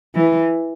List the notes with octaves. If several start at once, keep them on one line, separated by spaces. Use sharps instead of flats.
E3